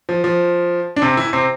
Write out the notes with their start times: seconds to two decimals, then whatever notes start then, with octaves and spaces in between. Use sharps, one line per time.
0.09 F3
0.24 F3
0.96 D4
1.02 C3 C4
1.17 E3 E4
1.33 C3 C4